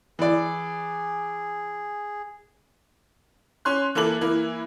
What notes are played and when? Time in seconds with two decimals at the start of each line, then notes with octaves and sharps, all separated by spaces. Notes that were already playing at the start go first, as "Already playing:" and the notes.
0.19 E3 G#4 D5
3.65 C#4 C6 F#6
3.95 E3 A#3 E4 A4 F#7
4.21 E3 A#3 E4